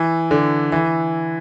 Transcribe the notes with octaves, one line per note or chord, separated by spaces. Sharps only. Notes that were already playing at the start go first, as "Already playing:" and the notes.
Already playing: E3
D3
E3